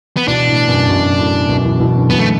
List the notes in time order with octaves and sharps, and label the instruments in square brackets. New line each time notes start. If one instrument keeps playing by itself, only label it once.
[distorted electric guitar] B3
[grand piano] B2 E3 [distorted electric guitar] D4
[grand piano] A2 D3
F#2 B2
F#2 B2
A2
F#2 B2
B2 E3
B2 E3
D3 F#3
[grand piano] B2 E3 [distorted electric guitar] B3
[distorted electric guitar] A3